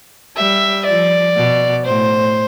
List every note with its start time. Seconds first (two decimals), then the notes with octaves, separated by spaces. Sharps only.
0.36 G3 E5
0.85 F3 D5
1.36 B2
1.85 A2 C5